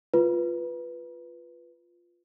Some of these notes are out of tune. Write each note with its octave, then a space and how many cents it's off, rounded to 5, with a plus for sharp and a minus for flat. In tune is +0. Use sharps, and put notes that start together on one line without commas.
F4 +0 B4 -5